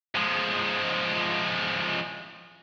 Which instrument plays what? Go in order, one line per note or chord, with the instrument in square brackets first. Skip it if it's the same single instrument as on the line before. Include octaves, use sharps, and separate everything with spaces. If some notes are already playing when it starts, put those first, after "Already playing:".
[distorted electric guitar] F3 G#3